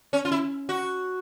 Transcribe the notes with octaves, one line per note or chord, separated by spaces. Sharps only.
C#4
F4
E4
F#4